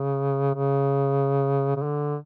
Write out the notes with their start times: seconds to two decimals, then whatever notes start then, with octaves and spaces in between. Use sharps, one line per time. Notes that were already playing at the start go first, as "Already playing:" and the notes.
Already playing: C#3
0.55 C#3
1.77 C#3
1.82 D3